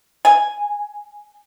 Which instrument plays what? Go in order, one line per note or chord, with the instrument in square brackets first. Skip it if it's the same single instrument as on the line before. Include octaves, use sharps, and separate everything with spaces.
[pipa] G#5